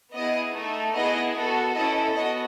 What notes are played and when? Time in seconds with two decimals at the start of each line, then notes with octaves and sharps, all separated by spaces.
0.13 B3 E4 G#4 D#5
0.53 A3 D#4 A4
0.94 B3 E4 G#4 D#5
1.34 B3 F#4 A4
1.75 C#4 E4 A4 D#5
2.15 B3 F#4 D#5